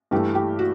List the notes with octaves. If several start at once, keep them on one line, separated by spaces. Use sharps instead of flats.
G2 E3 A3 G4
G4
F#4